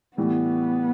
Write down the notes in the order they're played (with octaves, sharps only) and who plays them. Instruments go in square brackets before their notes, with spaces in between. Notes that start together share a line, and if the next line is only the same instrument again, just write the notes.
[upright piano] A2 E3 G3 [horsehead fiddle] B3